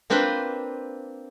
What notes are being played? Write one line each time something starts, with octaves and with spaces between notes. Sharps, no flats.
A#3 C4 D4 F4 B4 C5